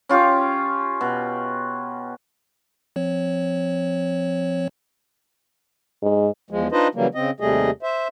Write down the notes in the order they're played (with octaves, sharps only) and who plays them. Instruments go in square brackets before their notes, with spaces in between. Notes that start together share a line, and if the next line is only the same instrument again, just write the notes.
[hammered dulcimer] C#4 F4 G4 D6
B2
[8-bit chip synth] F3 C4 C#5
[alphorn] G#2
[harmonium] E2 F3 G#3
D4 D#4 F4 B4 C5 D#5
C#3 E3 F#3 G3 A#3
C#3 C4 D#5
D#2 C3 G3 A3 G#4 D#5
C5 E5